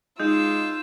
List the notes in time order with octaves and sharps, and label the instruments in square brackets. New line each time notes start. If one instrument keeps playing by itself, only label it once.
[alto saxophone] G#3 [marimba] D#4 [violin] F4 E6 [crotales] G6